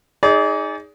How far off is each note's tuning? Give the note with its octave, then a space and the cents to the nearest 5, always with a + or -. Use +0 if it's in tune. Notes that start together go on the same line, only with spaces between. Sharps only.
D#4 +10 G#4 +0 D5 -35